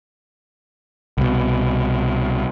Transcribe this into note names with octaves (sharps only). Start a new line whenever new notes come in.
C2 B2